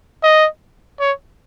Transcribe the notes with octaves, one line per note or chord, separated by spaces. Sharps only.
D#5
C#5